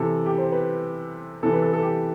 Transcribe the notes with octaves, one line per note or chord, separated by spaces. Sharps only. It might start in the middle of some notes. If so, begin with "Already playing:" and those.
Already playing: C3 E3 A4
G4
C5
B4
C3 E3 A4
B4
A4
A4
G4